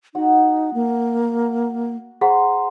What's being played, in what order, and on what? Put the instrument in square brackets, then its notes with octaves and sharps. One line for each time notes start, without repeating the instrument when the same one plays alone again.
[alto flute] D#4 [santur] F#4 F#5
[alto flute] A#3
[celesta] G#4 F#5 [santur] C5 A#5